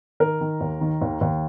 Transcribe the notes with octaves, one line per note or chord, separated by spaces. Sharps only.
D#3 A#4
D#3
D#2
D#3
D#2
D#2